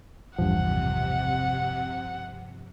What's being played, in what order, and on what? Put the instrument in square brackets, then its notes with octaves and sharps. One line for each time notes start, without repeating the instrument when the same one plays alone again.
[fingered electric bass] E1 A1 E2 [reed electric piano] G2 F3 [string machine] C3 [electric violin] F#5